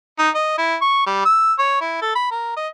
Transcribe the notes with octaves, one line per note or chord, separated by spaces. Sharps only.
D#4
D#5
E4
C#6
G3
E6
C#5
E4
A4
B5
A#4
D#5